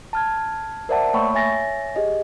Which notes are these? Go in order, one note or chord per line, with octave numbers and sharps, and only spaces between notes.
A5 F6 G#6
A#4 C5 D5 E5 F#5 A5
A3 A#3 C#5 G5 B5 C#6
C#5 E5 G#5 A6 A#6
G4 G#4 D#5